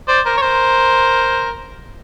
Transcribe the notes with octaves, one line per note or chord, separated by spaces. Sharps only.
C5 D5
A#4 C5
C#5
A#4 C5